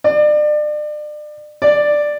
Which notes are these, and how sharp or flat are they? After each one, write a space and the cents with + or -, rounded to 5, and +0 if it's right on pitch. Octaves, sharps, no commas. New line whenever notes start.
D5 +35
D5 +5